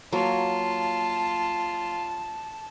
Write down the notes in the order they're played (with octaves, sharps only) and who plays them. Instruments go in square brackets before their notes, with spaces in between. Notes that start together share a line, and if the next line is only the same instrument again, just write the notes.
[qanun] F#3 A#3 [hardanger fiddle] F4 [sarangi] A5